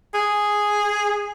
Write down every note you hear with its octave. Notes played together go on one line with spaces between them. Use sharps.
G#4